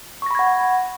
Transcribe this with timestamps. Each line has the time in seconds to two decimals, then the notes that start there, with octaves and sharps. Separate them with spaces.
0.22 C#6
0.26 A#6
0.31 B5
0.35 G#6
0.39 F#5